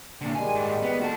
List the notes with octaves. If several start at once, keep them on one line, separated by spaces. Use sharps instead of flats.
A#2 D3
D#3 G3 G#3 G#5
G#2
B3
F#4 A4